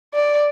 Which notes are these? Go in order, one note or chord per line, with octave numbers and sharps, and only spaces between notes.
D5